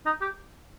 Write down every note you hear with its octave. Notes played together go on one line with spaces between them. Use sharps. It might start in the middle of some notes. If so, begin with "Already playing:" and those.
D#4
G4